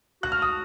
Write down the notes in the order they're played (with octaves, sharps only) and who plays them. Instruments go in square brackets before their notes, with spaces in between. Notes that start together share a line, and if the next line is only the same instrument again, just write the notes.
[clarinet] F#4 [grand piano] F#6
[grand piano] F6
D#6